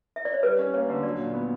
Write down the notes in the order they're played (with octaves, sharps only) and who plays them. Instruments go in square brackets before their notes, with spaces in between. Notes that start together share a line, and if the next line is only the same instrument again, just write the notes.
[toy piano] E5
D5
C#5
[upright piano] G3 [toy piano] B4
[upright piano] C#4
[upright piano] A#3 [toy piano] C#5
[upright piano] D3
[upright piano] F#3 [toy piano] D5
[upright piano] A#2
B3